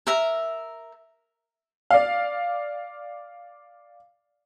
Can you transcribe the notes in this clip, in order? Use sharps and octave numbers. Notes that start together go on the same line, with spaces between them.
A#4 E5 A#5
D5 F5